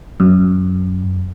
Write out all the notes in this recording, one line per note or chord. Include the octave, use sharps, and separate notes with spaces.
F#2